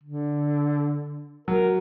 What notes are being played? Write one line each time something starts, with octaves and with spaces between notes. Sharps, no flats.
D3
F#3 A#4